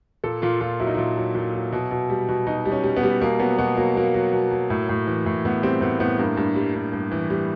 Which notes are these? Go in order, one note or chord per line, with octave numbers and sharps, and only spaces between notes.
A#2 A4
A#2 F4
A#2 F4
F#3 E4
D#4
A#2 E4
F#3
A#2
F#3
B2
B2
G3
B2
B2 D#4
G3
C#4
G3
B3
G3
B2 A#3
F#3 B3
B2 B3
F#3 A#3
F#3 A#3
F#3
B2
F#3
A2
A2
E3
A2
A2 B3
G3 C4
A2 B3
A2 B3
G2 A#3
G2
G3
G2
G2
E3
G3